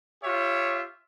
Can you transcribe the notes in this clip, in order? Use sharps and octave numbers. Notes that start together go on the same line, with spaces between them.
F4 G4 C#5 E5